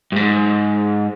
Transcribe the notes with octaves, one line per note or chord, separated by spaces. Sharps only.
G2
G#2